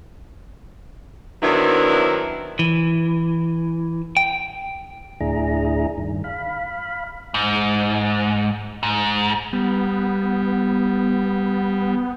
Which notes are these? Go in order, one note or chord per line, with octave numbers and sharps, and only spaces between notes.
D#3 F#3 B3 C4 D4 E4
E3
G5
D2 A2 D4 E4 G#4 A#5
G2 D#3
F5 B5
G#2
G#2
G3 B3